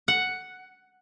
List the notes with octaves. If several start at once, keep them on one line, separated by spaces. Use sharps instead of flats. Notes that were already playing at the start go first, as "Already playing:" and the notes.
F#5